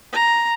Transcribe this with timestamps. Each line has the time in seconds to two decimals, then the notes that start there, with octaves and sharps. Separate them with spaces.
0.13 A#5